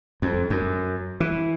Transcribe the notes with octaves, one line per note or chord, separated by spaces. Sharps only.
F2
F#2
E3